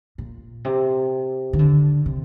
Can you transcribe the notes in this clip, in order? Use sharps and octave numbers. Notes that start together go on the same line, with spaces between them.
A#2
C3
D#3
D3
C3